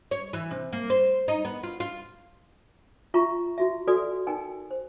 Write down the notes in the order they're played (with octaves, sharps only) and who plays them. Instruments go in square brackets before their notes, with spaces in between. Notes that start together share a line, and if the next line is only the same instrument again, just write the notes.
[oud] C#5
E3
C3
A#3
C5
D#4
B3
F4
F4
[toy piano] F4 E5 A#5 C#6
E4 F#4 E5
F#4 A4 B4 D5 G#5 D#6
D#4 A#4 G5 G#5
C5